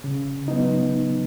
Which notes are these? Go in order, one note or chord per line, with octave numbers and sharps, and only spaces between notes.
C#3
F#3 B3 D#4